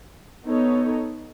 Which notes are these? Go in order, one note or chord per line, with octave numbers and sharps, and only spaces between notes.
B3 D#4 A4 C#5